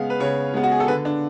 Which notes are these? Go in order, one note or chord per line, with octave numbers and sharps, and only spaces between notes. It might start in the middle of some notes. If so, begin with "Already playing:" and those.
Already playing: C#3 G#3 B3 F5
B4
C#3 C#5
G#3 B3
F#4
G#4
A4
D3 B4
D4